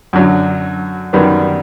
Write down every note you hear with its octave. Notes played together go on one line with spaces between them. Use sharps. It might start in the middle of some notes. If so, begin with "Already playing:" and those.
F#2 D3 F#3
F#2 D#3 G3 B3